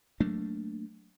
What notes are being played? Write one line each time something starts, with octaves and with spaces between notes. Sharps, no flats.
F#3 A3 A#3 D4